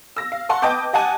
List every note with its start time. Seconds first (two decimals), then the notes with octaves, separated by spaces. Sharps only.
0.16 E6 A#6
0.32 F5
0.49 F#5 A5 C6 C#6
0.62 B4 D#5 G5 A5 D6 G6
0.93 G4 D#5 F#5 G#5 A5